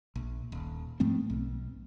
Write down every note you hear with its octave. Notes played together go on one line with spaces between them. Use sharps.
A#1
D#1
G#2 F3 A3 C4
B1